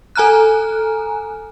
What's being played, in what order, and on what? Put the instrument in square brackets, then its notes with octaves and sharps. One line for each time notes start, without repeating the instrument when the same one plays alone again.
[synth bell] A4 G#5 A#5 F6 F#6